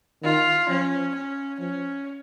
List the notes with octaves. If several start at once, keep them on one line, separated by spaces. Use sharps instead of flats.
D#3 F4
F3 C#4
C#4
F3 C#4